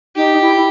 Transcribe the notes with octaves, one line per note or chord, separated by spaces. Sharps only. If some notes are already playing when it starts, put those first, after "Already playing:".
D#4 G4
E4
E4